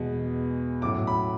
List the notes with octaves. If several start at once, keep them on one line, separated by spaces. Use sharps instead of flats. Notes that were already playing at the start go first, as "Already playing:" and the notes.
Already playing: E2 B2 G#3
A2 F#3 C#4 E4 D6
B5